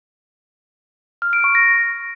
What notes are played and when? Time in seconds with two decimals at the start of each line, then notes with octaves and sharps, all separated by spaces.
1.22 F6
1.33 D7
1.44 C#6
1.55 A#6